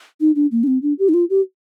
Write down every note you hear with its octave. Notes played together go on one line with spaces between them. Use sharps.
D#4
D4
A#3
D4
C4
D4
G4
D#4
F4
G4